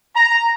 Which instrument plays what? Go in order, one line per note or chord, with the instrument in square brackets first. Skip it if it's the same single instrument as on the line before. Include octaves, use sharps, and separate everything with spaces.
[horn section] A#5